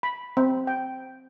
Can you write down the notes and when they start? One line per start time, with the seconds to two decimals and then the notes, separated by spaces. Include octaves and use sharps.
0.03 B5
0.37 C4
0.67 G5